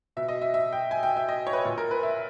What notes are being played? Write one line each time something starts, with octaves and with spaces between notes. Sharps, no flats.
B2 E5
D#5
E5
E5
G5
G#5
G5
E5
D#5
C#5
B4
A#2
A#4
B4
E5